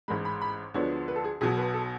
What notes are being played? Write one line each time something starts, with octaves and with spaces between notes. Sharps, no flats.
A1 G#2 G#3 B5
B5
B5
D2 D3 F3 G#3 B3 C#5
B4
A4
G#4
B1 B2 F#3 G#4
B4
A4